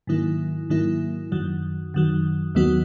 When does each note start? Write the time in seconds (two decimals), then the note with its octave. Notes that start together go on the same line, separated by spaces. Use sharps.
0.07 G#2 D#3 F#3 A#3 E4
0.70 G#2 D#3 F#3 A#3 E4
1.32 F#2 D#3 F#3
1.94 F#2 D#3 F#3
2.55 D#2 D#3 F#3 B3 F#4